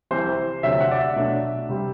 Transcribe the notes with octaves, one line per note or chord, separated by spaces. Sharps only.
C2 C3 E3 C5
D2 C3 F#3 E5
F#5
D5
E5
B2 F#3 A3 D4
C3 G3 C4